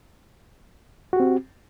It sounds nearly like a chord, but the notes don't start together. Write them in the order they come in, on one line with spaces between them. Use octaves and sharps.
F#4 G4 C4